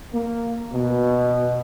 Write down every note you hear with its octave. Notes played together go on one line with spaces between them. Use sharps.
A#3
B2